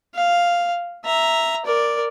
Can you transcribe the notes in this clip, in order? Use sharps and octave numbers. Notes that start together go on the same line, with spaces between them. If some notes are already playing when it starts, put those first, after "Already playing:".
F5
E5 A#5
A#4 D5